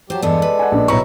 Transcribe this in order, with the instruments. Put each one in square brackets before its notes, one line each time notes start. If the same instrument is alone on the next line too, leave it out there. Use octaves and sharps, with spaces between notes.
[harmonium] F#3 G4 [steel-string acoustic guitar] C5 A5
[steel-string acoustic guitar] E2 G2 B3 [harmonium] G#3 A4 D5
[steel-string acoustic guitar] B4
[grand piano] F#5 G#5
A#1 D4
[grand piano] B1 A#5 C#6 [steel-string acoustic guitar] E4 B4 C#5